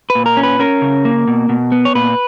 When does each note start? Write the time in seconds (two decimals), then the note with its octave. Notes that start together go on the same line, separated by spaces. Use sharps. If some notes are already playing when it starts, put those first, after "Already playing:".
0.10 B4
0.15 A#2
0.26 A#4
0.37 C#4
0.43 B4
0.59 C#4 A#4
0.82 C#3
1.05 A#3
1.28 B2
1.49 B2
1.72 B3
1.85 C#5
1.95 A#2 B4